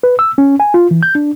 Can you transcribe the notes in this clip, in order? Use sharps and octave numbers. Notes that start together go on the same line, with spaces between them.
B4
E6
C#4
G#5
F4
E3
G6
D4